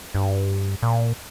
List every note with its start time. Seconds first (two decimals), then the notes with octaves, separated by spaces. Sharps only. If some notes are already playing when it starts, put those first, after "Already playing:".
0.15 G2
0.83 A#2